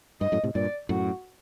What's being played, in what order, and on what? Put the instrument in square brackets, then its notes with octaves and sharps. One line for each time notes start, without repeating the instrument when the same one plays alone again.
[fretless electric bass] G2 [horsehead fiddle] D#5
[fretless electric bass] F#2 A2
A2 C3
[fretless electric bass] G2 A#2 [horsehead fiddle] D5
[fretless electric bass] F#2 A2 [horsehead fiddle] F#4